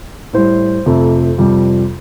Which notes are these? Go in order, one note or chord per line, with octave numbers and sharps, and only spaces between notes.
A2 G3 C5
F2 C3 A3
F2 C3 G3